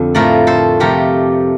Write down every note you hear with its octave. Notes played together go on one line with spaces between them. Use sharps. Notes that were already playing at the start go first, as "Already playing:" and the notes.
Already playing: F2 D3
A2 F3 A3 A#4 D5
A4 C5
C3 F3 A3 G4 A#4